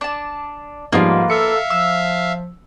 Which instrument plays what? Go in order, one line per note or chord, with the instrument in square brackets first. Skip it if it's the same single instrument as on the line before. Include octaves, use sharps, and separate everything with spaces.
[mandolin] D4 A5
[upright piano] G#2 F3 G3 [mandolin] A#3 B3 F4
[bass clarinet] A4 [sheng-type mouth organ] E5 F5 [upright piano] C#7
[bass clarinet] F3 [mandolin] E6